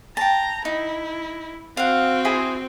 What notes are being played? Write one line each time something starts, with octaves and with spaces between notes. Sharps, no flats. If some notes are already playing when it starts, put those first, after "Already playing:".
G5 A5 A#5
D#4 E4
C4 F#4 F5 F#5
E4 G#4 C5